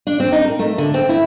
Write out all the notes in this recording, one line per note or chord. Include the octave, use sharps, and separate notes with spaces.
D4
C4
D#4
A#4
A3
D3
C4
E4